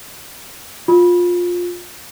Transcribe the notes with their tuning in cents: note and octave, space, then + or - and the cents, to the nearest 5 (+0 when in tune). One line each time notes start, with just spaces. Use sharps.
F4 +15